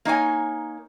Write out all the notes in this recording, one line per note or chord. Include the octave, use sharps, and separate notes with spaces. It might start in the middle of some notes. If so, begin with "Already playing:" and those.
A#3 D#4 C#5 G#5